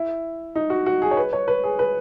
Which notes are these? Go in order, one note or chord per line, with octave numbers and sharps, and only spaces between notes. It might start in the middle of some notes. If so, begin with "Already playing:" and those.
Already playing: E4
D#4
F#4
F#4
G#4
C#5
B4
C#5
B4
G#4
B4